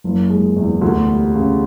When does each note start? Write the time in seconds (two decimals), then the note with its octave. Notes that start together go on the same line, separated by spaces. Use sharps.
0.04 F#1
0.30 G#3
0.56 E2
0.81 D2
1.09 G3
1.35 C#3